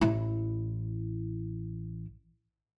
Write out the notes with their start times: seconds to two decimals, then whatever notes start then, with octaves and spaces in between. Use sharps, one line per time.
0.01 A1 E4